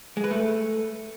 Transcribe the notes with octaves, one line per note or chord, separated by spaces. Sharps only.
G#3
B4
A3